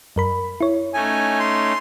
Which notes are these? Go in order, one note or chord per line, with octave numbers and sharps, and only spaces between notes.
F#2 A#4 B5
E4 C#5
A3 C#4 D#4 G#5
C6